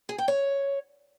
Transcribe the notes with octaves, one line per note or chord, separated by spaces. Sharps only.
G#4
G5
C#5